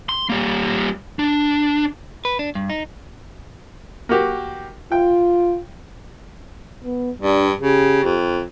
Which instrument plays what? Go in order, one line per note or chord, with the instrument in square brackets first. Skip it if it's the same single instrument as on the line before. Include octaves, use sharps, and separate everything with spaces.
[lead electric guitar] C6
G3 A#3
D4
[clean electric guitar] B4
D4
G2
D#4
[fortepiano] A#3 F#4 G4
[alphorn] F4 [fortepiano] G5
[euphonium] B3
[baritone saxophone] G2 [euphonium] D4
[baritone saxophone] C#3 [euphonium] G4
[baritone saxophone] F2